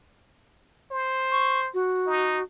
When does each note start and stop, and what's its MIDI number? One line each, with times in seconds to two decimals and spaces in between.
0.91 1.69 72
1.32 1.60 85
1.74 2.43 66
2.07 2.40 63